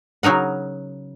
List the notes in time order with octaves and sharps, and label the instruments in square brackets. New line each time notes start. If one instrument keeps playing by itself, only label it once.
[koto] C#3 F#3 D#4 A#4 F#5